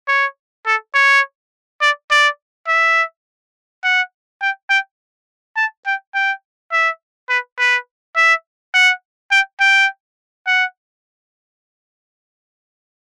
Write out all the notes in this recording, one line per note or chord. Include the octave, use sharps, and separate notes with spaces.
C#5
A4
C#5
D5
D5
E5
F#5
G5
G5
A5
G5
G5
E5
B4
B4
E5
F#5
G5
G5
F#5